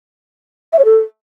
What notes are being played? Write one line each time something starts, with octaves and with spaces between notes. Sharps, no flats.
E5
C#5
A4